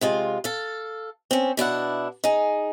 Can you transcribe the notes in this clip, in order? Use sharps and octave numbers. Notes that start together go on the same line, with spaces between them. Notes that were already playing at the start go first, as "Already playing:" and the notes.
C3 G#3 F4
A4 F5
C4 C#4
B2 D4 E4 F#5
D#4 G#4